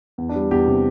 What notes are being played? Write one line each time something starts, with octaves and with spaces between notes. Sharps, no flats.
E2
D4
G3
E2 G4
C3